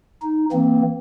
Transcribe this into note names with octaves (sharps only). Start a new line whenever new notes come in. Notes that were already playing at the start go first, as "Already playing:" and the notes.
D#4
E3 A#3 C4